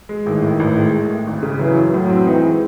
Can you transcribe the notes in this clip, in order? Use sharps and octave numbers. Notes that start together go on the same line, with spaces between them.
G#3
A1 D#3
A2
A1
G#3
A1
A2
G#1
C#3
E3 F#3
F#2
A2 F#3
C4
E3 D#4
G#3